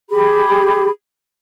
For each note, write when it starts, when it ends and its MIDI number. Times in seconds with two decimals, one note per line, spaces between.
0.11 0.89 67
0.11 0.89 68
0.11 0.89 83